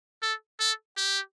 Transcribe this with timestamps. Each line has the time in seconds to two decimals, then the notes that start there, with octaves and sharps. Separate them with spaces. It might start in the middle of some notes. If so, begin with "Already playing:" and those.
0.22 A4
0.60 A4
0.97 G4